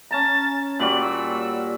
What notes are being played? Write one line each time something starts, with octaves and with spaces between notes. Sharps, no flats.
C#4 A5 A#5 A6
A#2 G3 F#4 F#7
E6